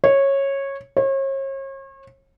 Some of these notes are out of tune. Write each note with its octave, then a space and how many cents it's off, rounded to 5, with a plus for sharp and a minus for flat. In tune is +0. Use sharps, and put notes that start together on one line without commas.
C#5 -15
C#5 -40